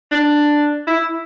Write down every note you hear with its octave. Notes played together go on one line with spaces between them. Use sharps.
D4
E4